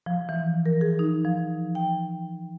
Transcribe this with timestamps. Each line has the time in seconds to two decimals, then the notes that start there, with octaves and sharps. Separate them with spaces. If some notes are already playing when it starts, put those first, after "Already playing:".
0.06 F3
0.29 E3
0.66 A#4
0.81 G#4
0.99 D#4
1.25 F3
1.75 G5